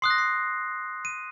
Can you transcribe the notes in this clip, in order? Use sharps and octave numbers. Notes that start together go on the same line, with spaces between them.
C6 D#6 F#6 C7
A#6
C7
D#7